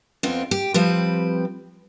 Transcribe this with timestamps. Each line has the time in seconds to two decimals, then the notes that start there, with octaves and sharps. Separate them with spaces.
0.23 F2 B3 C4 F4
0.51 G4
0.74 F3 G3 C4 B4